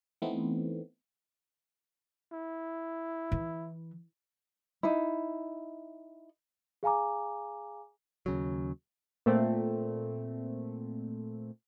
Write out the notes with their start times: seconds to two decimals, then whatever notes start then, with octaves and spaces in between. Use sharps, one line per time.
0.22 E3 A3 B3 C4 D#4
2.33 E4
3.32 E3
4.83 D#4 E4
6.83 G#4 F5 G#5 A#5 D6
8.26 D#2 C#3 F#3
9.26 A#2 A3 C4